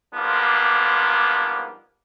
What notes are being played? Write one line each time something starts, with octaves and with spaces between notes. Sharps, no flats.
G#2 F3 G3 A#3 B3 D4